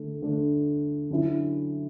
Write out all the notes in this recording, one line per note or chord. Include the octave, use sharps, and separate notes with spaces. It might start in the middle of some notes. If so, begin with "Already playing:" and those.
Already playing: D3 A3 D4
D3 A3 D4
D3 F#3 C#4 E4